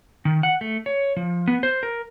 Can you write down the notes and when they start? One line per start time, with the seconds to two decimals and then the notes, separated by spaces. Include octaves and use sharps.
0.25 D#3
0.43 F#5
0.61 A3
0.86 C#5
1.17 F3
1.47 B3
1.63 C5
1.83 A#4